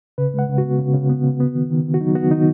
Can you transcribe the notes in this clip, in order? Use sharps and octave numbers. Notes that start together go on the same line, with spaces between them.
C#3 B4
G#3 F#5
C#3
F#4
B3
C#3
C#3
B3
C#3
B3
D#3
D#3
D#3
F#4
F#3 D#4
B3 F#4
D#3 D#4